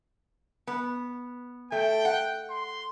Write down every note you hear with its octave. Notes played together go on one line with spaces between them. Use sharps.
B3
A3 G5
F#5
C6